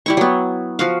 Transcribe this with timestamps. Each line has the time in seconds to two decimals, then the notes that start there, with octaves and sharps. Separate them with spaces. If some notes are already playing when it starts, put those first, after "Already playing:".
0.06 G3 E4 C#6
0.17 F#3 B3
0.79 F3 F#4 F5